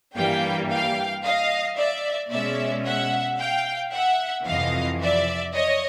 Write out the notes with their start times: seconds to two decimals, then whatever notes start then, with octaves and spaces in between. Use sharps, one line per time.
0.16 G2 E3 G3 A#3 F5 G5
0.70 F5 G5
1.24 D#5 F5
1.77 D5 E5
2.31 B2 G#3 C#4 D5 E5
2.85 E5 F#5
3.39 F5 G5
3.93 E5 F#5
4.47 F2 C3 E3 D#5 F5
5.01 D5 E5
5.54 C#5 D#5